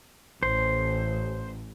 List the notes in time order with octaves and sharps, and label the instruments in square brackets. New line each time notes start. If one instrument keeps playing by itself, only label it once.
[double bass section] A1 [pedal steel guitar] C5